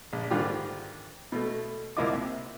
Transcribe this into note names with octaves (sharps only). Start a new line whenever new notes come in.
A#1
G#2 D3 D#3 G3 F4 G4
B2 A3
C2 A#3 E4 F4 D#5 D6
C3